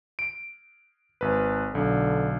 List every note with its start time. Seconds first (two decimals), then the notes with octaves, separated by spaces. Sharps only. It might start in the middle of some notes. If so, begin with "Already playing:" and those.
0.19 D7
1.21 G#1 B4
1.75 B1 D3